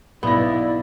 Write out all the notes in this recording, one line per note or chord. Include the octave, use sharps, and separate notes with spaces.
B1 B3 E4 D5 A#6